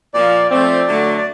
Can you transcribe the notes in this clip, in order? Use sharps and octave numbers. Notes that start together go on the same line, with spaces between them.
A#2 F3 A#3 D5
F3 A3 C4 D5
D3 F#3 A3
D5